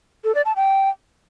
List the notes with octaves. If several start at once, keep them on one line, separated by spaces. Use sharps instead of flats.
A4
D5
A5
G5